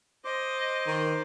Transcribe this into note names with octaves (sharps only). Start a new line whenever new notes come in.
C5 D#5 D6
D#3